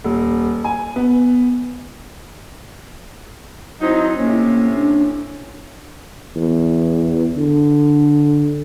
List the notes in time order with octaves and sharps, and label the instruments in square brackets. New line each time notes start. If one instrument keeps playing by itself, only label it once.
[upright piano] D#1
G#5
B3
[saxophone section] F#3 C4 D#4 [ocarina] E4
[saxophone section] A2 C3 C#4 [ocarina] A#3
[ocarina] D4
[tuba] E2
D3